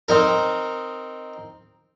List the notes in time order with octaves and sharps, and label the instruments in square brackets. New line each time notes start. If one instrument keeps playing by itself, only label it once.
[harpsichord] C4 D#4 A#4